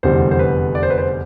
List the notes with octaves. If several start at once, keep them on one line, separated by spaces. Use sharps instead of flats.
F1 E2 D3 G3 C5
C5
B4
D5
C5
B4
C5